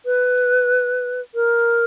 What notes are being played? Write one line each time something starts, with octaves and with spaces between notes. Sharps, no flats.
B4
A#4